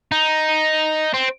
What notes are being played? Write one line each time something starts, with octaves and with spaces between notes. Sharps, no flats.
D#4
C4